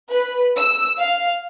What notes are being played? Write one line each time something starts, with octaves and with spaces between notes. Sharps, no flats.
B4
E6
F5